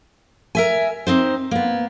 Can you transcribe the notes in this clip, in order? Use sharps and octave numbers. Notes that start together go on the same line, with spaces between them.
A#4 E5 G#5
C4 D#4 C5
A#3 B3